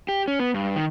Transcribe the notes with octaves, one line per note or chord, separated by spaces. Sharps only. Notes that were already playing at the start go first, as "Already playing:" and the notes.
G4
C#4
B3
G2
D#3